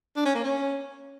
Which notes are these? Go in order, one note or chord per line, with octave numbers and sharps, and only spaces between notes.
D4
C#4
A#3
C#4